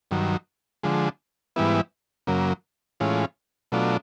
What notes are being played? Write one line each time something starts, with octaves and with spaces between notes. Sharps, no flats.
G2 D#3 F#3
D3 F3 G#3
G#2 E3 G3 B3 E4
F#2 C#3 F#3 A#3
A2 E3 G#3 C#4 F4
B2 F#3 A3 D4 F4